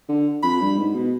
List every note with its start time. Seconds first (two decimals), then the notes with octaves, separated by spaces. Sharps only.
0.09 D3
0.43 F2 B5
0.61 G2
0.78 G#2
0.95 B2